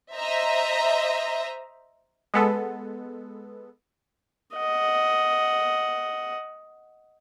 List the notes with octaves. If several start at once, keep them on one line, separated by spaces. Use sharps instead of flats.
C5 D#5 E5 A#5
G#3 B3 A4
D#5 F#5